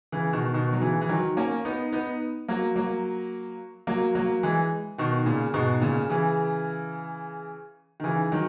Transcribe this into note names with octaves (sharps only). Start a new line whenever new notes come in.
C#3 E3
B2 D#3
B2 D#3
F#3
C#3 E3
E3
D#3 F#3
A#3 C#4
B3 D#4
B3 D#4
F#3 A#3
F#3 A#3
F#3 A#3
F#3 A#3
E3 G#3
B2 D#3
A#2 C#3
G#2 B2
A#2 C#3
C#3 E3
D#3
C#3 E3
D#3 F#3